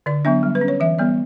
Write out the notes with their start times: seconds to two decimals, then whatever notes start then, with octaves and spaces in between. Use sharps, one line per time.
0.06 D3 D5
0.25 F#3 B3 D4 E5
0.43 G3
0.55 B4
0.61 C#4
0.68 C#5
0.80 E3 E5
0.99 G3 B3 D5